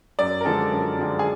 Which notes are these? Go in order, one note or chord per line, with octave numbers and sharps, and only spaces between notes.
F#2 D5
A#4
D3 F3 G#3 A4
F#2
D3 F3 G#3
G#4